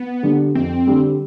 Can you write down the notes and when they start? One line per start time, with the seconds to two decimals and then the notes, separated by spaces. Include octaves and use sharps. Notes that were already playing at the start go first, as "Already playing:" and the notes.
Already playing: B3
0.23 D3 G3
0.55 F2 C4
0.87 D3 G3